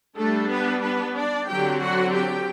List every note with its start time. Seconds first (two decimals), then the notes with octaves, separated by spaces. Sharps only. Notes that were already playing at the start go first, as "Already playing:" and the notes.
0.16 G3 A3 D4 A4
0.49 B3 B4
0.81 B3 B4
1.14 D4 D5
1.47 D3 F#3 C4 G4 G5
1.80 F#4 F#5
2.12 G4 G5